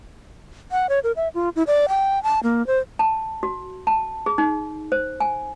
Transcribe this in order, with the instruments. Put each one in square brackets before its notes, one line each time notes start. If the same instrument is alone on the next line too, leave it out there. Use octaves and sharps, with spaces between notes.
[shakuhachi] F#5
C#5
A#4
E5
F4
E4
D5
G5
A5
A#3
C5
[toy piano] A5
F#4
A5
G#4
D#4
C5
G#5